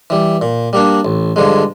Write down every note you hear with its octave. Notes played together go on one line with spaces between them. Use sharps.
E3 G3
A#2
G3 A#3 D4
A1
G2 D3 F3 G#3